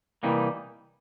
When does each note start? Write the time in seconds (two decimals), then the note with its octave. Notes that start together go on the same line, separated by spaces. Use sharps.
0.23 C3 E3 G3 A#3 D#4